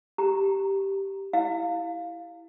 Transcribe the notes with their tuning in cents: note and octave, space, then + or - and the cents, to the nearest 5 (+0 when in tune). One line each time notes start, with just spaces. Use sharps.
G4 -5 A#5 +0
E4 +0 F5 +0